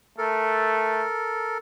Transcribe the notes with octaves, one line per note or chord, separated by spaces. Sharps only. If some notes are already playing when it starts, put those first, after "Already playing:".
A3 A4 A#4